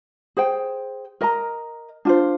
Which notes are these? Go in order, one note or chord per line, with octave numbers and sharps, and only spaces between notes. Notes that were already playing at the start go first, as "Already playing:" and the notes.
G#4 C5 G5
A#4 D#5 A#5
D4 F4 C5